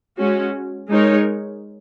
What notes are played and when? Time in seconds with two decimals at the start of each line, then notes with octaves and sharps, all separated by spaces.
0.17 G#3 C#4 F#4
0.89 G#3 D#4 A#4 C#5